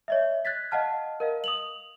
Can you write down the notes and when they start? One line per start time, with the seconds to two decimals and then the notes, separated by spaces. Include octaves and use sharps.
0.08 C#5 D#5 E5
0.45 F#6 G#6 A6 B6
0.71 D#5 F5 F#5 A5 F6
1.20 A#4 D#5 F5
1.44 D#6 F7 F#7